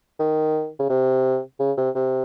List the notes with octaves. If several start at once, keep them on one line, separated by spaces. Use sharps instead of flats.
D#3
C#3
C3
C#3
C3
C3